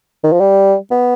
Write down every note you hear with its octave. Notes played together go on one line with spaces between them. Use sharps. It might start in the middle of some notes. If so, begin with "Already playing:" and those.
D#3
F3
G3
B3